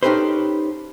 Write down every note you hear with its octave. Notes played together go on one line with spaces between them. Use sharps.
C#4 D#4 G4 A4 B4 C5